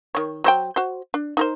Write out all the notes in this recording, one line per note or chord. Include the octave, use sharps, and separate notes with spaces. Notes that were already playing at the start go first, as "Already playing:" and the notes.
D#3 C#5
F#3 C5 G5
F#4 C5
D4
D#4 A#4 C5